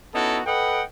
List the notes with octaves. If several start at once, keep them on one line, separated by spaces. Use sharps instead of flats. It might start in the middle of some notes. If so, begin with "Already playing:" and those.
B3 C#4 D#4 E4 F#4 A4
A4 B4 D#5 F#5 G5